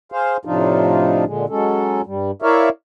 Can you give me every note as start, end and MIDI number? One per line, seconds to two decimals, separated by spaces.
0.12 0.37 68
0.12 0.37 72
0.12 0.37 77
0.45 1.25 45
0.45 1.25 48
0.45 1.25 53
0.45 1.25 62
0.45 1.25 63
0.45 1.25 65
1.26 1.46 46
1.26 1.46 50
1.26 1.46 56
1.49 2.02 54
1.49 2.02 56
1.49 2.02 61
1.49 2.02 69
2.06 2.31 43
2.06 2.31 55
2.42 2.69 64
2.42 2.69 70
2.42 2.69 73
2.42 2.69 74
2.42 2.69 76
2.42 2.69 77